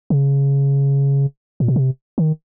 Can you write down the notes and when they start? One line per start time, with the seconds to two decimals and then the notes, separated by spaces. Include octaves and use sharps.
0.10 C#3
1.60 A#2
1.68 B2
1.76 C3
2.18 D#3